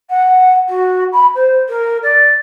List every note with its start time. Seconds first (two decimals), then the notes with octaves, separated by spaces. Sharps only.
0.10 F#5
0.69 F#4
1.12 B5
1.35 C5
1.69 A#4
2.03 D5